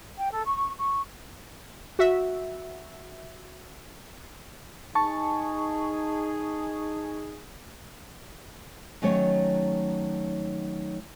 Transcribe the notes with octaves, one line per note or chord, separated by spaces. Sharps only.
G5
A4
C#6
C#6
F#4 E5
D#4 G#4 A5 C#6
D#3 F#3 A3 C#4 D#4 C#5